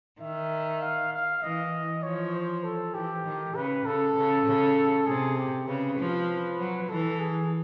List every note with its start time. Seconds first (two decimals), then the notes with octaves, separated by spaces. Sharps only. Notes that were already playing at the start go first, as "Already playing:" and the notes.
0.21 D#3 E5
0.82 F5
1.13 F5
1.43 E3 D#5
2.03 F3 C#5
2.35 C5
2.64 A4
2.94 E3 G4
3.25 D#3
3.55 C#3 B4
3.85 C#3 A4
4.16 C#3
4.46 C#3
5.07 C3 G#4
5.37 G4
5.67 C#3 B4
5.98 F3
6.59 F#3
6.89 E3 A4
7.20 G#4